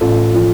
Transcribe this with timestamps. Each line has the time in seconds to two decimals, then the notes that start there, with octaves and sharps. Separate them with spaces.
0.01 A1 F4 A4
0.34 F3